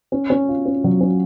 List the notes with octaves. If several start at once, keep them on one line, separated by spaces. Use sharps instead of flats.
C#4
C#4
F4
C#4
F#3
C#4